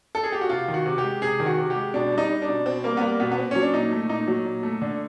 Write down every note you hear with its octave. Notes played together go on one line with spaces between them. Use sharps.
A4
G#4
G4
F#4
C3 F4
D#3
F#4
C3
G4
G#3
C3 G#4
D#3
F#4
C3
G4
G#3
B2 D4
G3
D#4
G3
D4
B2
B2 C4
G3 A#3
B3
G3 A#3
B2 B3
B3
A#2 C4
F#3 C#4
D4
A#2 D#4
A3
A#2 D#4
F#3
A#2
A3
D3